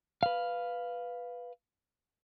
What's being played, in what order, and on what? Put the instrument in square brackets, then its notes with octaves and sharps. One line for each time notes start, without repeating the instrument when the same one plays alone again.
[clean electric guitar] B4 F5